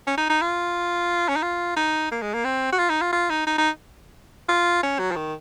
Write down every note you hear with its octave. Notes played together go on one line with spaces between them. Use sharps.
C#4
D#4
D#4
F4
C#4
D#4
F4
D#4
A#3
G#3
A#3
C4
F#4
F4
D#4
F4
F4
D#4
D#4
D#4
F4
C#4
F#3
F3
D#3